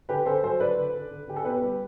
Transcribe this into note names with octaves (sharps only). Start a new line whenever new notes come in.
D3 G4 B4
D3 A4 C5
F#3 A4 C5
D3 B4 D5
D3
D3
D3
D3 G4
A4
B2 G4 B4
G3